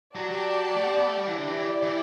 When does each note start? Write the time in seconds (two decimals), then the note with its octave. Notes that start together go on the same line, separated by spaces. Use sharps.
0.16 F#3 G4 D5 F#5 A5
0.31 F#3
0.77 A3
0.86 C4
0.97 B3
1.07 A3
1.17 G3
1.27 E3
1.37 D3 E4 G4 D5
1.47 E3
1.57 E3
1.83 E3